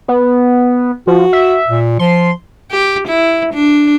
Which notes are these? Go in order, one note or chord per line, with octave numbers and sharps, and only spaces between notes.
B3
F3 F#4
E5
A#2
F3 C6
G4
E4
D4